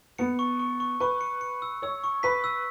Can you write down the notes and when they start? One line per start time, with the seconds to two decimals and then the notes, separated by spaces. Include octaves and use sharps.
0.18 B3 C#7
0.39 C#6
0.59 C#6
0.80 C#6
1.00 B4 C#6
1.21 C#7
1.41 C#7
1.62 E6
1.82 C#5 E6
2.04 C#6
2.23 B4 B6
2.44 E6